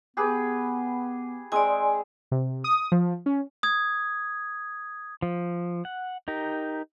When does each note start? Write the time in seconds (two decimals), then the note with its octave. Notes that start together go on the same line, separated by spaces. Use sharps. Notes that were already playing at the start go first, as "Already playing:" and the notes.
0.17 B3 G4 G#4 B4
1.52 G#3 C4 D5 G#5 D#6
2.31 C3
2.64 D#6
2.92 F3
3.26 C#4
3.63 D#6 G#6
5.22 F3
5.85 F#5
6.28 D#4 G4 A#4